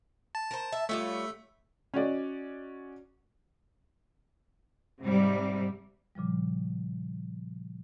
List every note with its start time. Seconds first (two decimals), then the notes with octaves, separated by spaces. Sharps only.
0.35 A5
0.51 A#4 C5
0.72 E5
0.89 G3 A3 F4 C#5 E5
1.94 C#4 F#4 D5 D#5
5.00 G#2 C3 G3
6.15 A#2 C#3 F3 G3